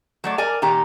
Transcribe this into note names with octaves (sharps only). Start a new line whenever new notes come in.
F#3 A3 D5
A#4 D5 G#5
A#2 D#3 G4 A#5